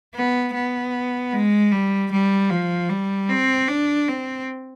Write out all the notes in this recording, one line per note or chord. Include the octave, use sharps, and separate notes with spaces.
B3
B3
G#3
G3
G3
F3
G3
C4
D4
C4